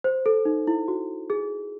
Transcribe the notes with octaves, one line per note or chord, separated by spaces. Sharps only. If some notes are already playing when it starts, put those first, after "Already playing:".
C5
A4
D#4
E4
F#4
G#4